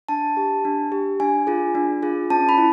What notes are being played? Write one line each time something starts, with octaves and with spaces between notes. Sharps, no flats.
D4 A5
G4
D4
G4
D4 G#5
F4 G#4
D4
F4 G#4
C#4 A5
B5
E4